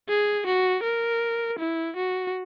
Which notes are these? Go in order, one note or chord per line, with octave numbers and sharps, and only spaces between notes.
G#4
F#4
A#4
E4
F#4